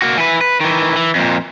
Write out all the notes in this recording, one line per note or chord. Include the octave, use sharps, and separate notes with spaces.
A#3 F#4
E3 B4
B4
D#3 E3
E3
F2 A#2